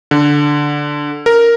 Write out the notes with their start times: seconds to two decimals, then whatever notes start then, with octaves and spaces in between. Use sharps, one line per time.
0.11 D3
1.26 A#4